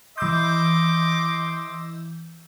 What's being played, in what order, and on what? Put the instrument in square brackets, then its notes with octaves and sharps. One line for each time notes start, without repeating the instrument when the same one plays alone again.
[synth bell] E3 E6 G6 [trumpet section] D#5 C6 D6